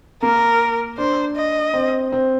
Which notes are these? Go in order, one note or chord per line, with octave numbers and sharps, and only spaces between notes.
A#3 A#4
D4 C5
D#5
C4
C4